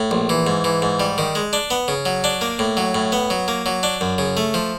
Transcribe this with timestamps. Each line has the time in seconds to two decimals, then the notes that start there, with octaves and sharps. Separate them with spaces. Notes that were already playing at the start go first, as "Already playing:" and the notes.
Already playing: A2
0.11 A#1
0.29 E3
0.47 G#2
0.64 E3
0.82 G#2
1.00 G3
1.18 D#3
1.35 G#3
1.53 D4
1.71 B3
1.88 C#3
2.05 F#3
2.24 D4
2.41 A#3
2.59 A2
2.77 F#3
2.95 A2
3.12 B3
3.30 F#3
3.48 A#3
3.66 F#3
3.83 D4
4.01 F#2
4.18 C#3
4.37 A3
4.54 F3